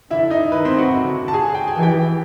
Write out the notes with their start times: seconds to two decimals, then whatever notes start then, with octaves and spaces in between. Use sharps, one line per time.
0.10 D3 E4 E5
0.30 D#4 D#5
0.52 D#3 B4
0.65 C4 C5
0.78 F#4 F#5
0.92 D3
1.28 A5
1.33 G#4 G#5
1.54 G5
1.68 G#5
1.75 E3
1.82 G4 G5